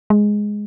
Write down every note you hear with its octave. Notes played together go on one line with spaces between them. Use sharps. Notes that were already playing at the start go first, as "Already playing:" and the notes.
G#3